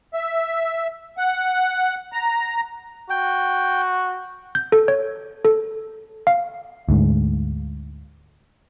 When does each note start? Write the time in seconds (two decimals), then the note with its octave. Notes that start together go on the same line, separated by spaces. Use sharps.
0.14 E5
1.18 F#5
2.13 A#5
3.10 F#4 G5
4.55 G6
4.72 A4
4.88 C#5
5.45 A4
6.27 F5
6.89 D2 G#2